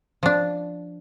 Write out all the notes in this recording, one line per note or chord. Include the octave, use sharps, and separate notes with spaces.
F3 D4